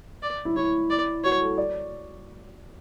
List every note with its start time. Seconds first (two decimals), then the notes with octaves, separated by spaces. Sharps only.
0.22 D5
0.45 E4
0.56 E4 C#5
0.90 D5
1.24 F#4 C#5
1.41 A4
1.58 D5